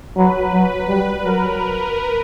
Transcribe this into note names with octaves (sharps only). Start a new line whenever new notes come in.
F#3 B4
F#3
G3
F#3 A#4